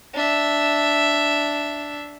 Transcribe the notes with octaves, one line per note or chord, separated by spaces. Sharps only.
D4 E5